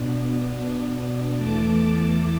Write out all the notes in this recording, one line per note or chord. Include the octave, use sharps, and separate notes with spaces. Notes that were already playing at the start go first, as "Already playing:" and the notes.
Already playing: B2 B3 D4
B2 B3 D4
E2 E3 A3 A5 D6